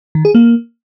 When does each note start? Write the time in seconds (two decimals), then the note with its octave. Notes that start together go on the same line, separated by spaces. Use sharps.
0.15 D#3
0.25 G#4
0.35 A#3